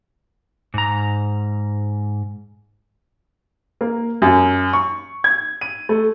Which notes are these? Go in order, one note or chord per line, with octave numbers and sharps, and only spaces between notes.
G#2 A#5
A#3
F#2
C#6
G#6
D#7
A3